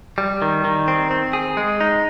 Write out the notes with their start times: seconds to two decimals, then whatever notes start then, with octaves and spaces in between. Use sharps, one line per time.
0.18 G3
0.42 D#3
0.65 D#3
0.88 C4
1.11 C4
1.33 G#4
1.57 G#3
1.81 D#4